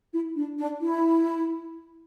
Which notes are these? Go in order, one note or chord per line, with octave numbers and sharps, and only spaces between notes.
E4
D4
D4
E4